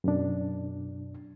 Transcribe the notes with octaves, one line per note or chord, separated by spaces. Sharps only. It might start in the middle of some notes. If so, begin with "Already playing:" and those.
F#2 B2 D4